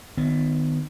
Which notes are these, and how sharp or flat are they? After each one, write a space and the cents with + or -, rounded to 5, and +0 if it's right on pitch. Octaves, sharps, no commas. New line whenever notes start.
D#3 -25 B3 +15